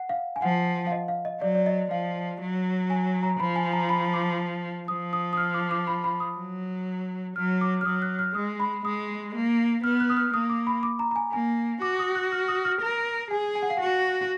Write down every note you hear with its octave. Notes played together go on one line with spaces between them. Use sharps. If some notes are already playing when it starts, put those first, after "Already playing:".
Already playing: F#5
F5
G#5
F3 F#5
F5
D#5
F5
D#5
F#3 D5
D5
D#5
F3 F5
F#3
G#5
A#5
F3 B5
G#5
A#5
B5
D6
F3 D#6
D#6
D#6
F6
D6
D6
B5
B5
D#6
F#3
F#3 F6
D6
F6
F#3 D#6
F#6
F6
G#3 D#6
B5
G#3 D#6
A#3
B3 F6
F#6
D#6
F6
A#3 D#6
D6
B5
D6
A#5
A#5
G#5
A#3 G#5
F#4 D6
D#6
F#6
F6
D#6
F6
A#4
G#4 G#5
G#5
F#5
F5
F#4 F#5